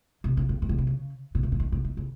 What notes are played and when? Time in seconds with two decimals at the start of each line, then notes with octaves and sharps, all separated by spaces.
0.24 C3
0.37 C#3
0.49 D#3
0.62 D#3
0.69 C#3
0.78 C3
0.87 C#3
1.35 A#2
1.43 C3
1.52 C#3
1.60 D#3
1.72 C#3
1.85 D#3
1.97 C#3